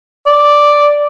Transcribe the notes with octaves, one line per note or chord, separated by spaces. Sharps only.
D5